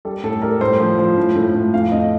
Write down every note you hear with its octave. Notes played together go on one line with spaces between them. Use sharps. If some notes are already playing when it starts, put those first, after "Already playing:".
G3 A4
A2 A4
G3 A#4
A2 C5
F3
F3
A2
A2
A2
F2 F5
F2 D#5